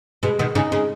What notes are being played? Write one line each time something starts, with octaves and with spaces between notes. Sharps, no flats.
B2 G#3
B2 D#3 G#3
C#3 D#4
C#3 G#3